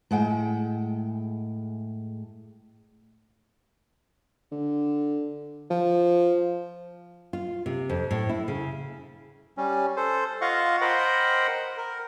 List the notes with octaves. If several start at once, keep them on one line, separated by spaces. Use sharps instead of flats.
A2 G#3 F#5 G5
D3
F3
F4
C3
F2
A2
E4
C#3
G3 C#4
A4 C5
F4 D#5 F5 F#5 C#6
A#4 C5 D#5 F#5 G5 B5
A#4